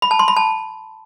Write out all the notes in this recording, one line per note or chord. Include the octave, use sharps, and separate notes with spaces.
B5
A5
C6
B5
A5